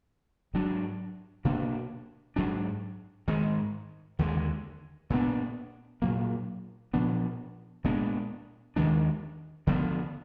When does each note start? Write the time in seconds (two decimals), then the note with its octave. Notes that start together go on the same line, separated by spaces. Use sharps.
0.54 G#2 F#3 D4
1.45 B2 A#3 D4
2.36 G#2 F#3 D4
3.28 G#2 D#3 G#3
4.19 D#2 D3 G#3
5.10 A#2 G#3 B3 D4
6.02 A#2 F#3 A#3
6.94 A#2 F3 B3 D4
7.84 A#2 G#3 B3 D4
8.76 D#2 D#3 G#3 D4
9.67 D2 D3 F3 B3